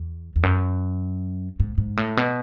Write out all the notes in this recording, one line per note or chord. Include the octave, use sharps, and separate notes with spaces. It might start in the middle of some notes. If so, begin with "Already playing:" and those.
Already playing: E2
E2
F#2
G#2
G#2
A2
B2